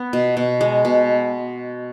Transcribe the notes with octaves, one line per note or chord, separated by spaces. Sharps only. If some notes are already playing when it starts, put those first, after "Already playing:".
Already playing: B3
B2
B2
G#3
B2